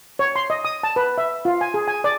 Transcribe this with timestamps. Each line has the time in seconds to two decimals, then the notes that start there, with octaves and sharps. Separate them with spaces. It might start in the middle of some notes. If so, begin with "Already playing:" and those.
0.19 C#5
0.36 C6
0.50 D#5
0.65 D#6
0.83 A5
0.96 B4
1.18 E5
1.45 F4
1.61 G#5
1.74 G#4
1.88 G#5
2.04 D5